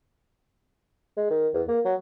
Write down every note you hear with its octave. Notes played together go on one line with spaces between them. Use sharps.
G#3
D#3
E2
A#3
F#3